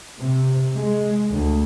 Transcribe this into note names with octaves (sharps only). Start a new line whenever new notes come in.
C3
G#3
D2